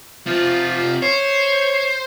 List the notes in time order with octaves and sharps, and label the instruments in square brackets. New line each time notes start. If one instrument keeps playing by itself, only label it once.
[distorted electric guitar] C3 F4 [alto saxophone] F3
[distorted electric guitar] C5 [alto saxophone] C#5